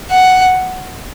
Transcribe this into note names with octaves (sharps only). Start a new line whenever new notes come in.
F#5